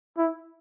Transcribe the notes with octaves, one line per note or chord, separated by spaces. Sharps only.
E4